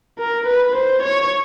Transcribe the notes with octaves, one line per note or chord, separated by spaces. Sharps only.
A#4
B4
C5
C#5